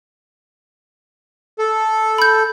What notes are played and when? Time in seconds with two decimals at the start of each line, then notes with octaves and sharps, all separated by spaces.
1.59 A4
2.18 B5 G6